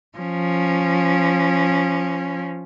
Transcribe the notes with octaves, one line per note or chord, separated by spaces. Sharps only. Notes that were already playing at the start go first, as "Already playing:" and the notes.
F3 C#4